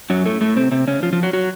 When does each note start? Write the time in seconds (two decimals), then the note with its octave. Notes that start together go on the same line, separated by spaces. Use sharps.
0.10 F#2 F#3
0.26 A2 A3
0.41 A2 A3
0.56 C3 C4
0.71 C3 C4
0.87 C#3 C#4
1.02 F3 F4
1.12 F3 F4
1.23 F#3 F#4
1.33 F#3 F#4